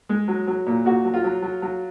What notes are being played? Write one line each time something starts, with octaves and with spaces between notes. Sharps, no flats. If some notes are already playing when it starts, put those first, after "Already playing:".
G#3
F#3
F#3
A#2
A#2 F#4
F#3
F4
F#3
F#3
F#3